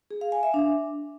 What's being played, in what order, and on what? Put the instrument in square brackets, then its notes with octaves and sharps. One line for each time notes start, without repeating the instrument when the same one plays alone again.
[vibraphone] G#4
F5
G#5
E5
D4